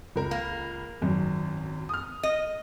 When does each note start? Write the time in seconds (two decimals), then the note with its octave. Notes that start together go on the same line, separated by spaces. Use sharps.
0.16 C#2 A#4
0.31 A#3
1.02 G#1 F#2
1.89 D#6 F6
2.23 D#5